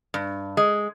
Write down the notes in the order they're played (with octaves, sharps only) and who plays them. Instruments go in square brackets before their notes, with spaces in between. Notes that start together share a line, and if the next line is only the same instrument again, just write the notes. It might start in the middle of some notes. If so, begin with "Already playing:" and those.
[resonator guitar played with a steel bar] G2
G#3